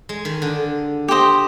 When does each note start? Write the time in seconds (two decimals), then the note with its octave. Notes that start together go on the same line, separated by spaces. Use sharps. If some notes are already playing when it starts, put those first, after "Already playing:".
0.09 G#3
0.25 D#3
0.42 D3
1.08 G4 C5 D#5